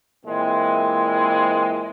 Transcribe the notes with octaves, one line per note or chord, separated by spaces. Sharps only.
A#2 E3 G#3 C4